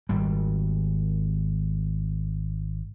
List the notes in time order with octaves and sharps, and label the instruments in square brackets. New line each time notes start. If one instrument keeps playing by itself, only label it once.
[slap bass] G#1 G3